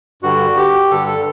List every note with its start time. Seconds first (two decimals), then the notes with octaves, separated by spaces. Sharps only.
0.23 G2 D3 F#4
0.57 G4
0.91 G2 D3 A4
1.08 A4